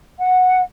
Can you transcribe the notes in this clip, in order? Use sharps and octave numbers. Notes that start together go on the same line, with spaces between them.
F#5